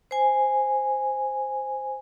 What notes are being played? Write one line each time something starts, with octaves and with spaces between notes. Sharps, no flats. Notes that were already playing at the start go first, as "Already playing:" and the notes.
C5 G#5